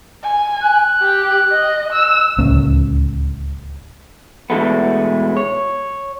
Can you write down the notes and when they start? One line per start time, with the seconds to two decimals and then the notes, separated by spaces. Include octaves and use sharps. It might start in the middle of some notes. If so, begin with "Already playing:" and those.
0.23 G#5
0.62 F#6
1.02 G4
1.52 D#5
1.93 E6
2.38 D1 C#2 A#3 C#4
4.50 B2 E3 G#3 A3 B3
5.37 C#5